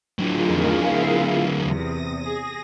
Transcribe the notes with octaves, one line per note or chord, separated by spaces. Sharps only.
D3 F#3 F4 G#4 A#4
F2 D#3 A3
B3 E4 F5
E2 C3 D#6 A#6
G#4